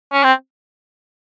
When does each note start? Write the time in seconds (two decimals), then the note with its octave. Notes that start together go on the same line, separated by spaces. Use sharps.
0.13 C#4
0.24 C4